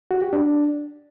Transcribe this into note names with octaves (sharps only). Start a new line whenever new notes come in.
F#4
G4
D4